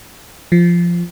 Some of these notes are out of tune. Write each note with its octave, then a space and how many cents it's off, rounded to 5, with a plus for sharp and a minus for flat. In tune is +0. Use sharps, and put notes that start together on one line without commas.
F3 -10